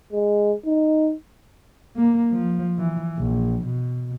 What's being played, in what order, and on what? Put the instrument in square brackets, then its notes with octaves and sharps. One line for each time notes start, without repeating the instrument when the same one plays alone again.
[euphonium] G#3
D#4
[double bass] A#3
F3
E3
A#1
B2